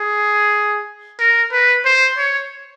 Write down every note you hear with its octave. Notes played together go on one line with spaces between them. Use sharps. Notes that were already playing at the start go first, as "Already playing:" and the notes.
Already playing: G#4
A#4
B4
C5
C#5